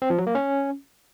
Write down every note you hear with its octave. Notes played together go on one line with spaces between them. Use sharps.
C4
F3
F#3
A#3
C#4